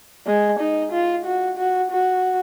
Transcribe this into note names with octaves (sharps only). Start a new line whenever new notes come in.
G#3
D#4
F4
F#4
F#4
F#4